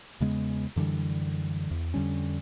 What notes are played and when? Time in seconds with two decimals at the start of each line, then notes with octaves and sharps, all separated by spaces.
0.20 E2 C#3 G#3 B3
0.76 F#2 D3 E3 G3
1.71 E2
1.94 F2 D3 G3 C#4